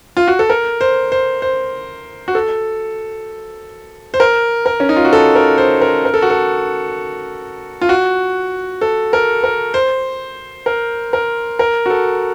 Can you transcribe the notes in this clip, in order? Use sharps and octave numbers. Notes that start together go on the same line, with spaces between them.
F4
F#4
A4
A#4
C5
C5
C5
F#4
A4
C5
A#4
A#4
C#4
D#4
F4
F#4
A4
A#4
C5
A#4
A#4
A4
F#4
A4
F4
F#4
A4
A#4
A#4
C5
A#4
A#4
A#4
F#4
A4